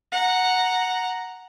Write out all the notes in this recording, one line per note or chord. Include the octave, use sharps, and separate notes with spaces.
F#5 A#5